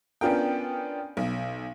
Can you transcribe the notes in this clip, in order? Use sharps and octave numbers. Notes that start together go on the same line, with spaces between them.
B3 C#4 D4 F4 A#4 G5
B1